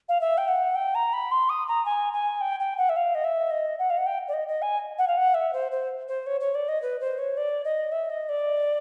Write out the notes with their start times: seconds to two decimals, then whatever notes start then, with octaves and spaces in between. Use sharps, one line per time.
0.08 F5
0.20 E5
0.37 G5
0.48 F#5
0.75 G5
0.94 A#5
1.13 B5
1.31 C6
1.49 D#6
1.67 A#5
1.85 G#5
2.13 G#5
2.41 G5
2.59 G5
2.77 F#5
2.89 E5
2.96 F5
3.14 D#5
3.24 E5
3.50 D#5
3.79 F#5
3.90 F5
3.97 F#5
4.06 G5
4.28 D5
4.33 D#5
4.48 D#5
4.61 G#5
4.98 F#5
5.07 F5
5.17 F#5
5.34 E5
5.53 C5
5.71 C5
6.08 C5
6.26 C#5
6.40 C#5
6.54 D5
6.68 D#5
6.82 B4
7.00 C5
7.18 C#5
7.37 D5
7.64 D#5
7.91 E5
8.09 D#5
8.29 D5